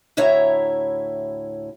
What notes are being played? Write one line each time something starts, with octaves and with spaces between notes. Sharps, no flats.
D2 A2 E4 C#5 E5 A#5